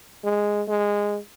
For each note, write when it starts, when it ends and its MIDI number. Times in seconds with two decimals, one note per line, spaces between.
0.24 0.63 56
0.68 1.18 56